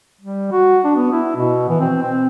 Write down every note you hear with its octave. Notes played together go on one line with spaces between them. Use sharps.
G3
F#4
D4
B3
E4
B2
E3
C4
C4